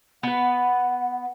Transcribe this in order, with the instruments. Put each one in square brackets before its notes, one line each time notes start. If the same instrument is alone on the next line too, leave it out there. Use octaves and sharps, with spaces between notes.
[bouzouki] B3 B4 [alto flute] F#5